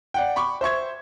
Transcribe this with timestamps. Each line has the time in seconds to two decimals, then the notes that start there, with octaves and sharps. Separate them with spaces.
0.14 D5 F#5 G5
0.36 B5 C#6 D6
0.61 C5 E5 C#6 G#6